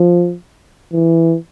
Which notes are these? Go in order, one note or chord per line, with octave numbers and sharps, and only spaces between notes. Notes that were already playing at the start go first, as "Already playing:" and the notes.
Already playing: F3
E3